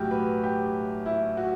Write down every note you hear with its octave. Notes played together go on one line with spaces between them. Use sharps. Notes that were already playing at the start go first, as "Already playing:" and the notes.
Already playing: B1 A2 E3 F#4 G4
B4
G4
E4
F#4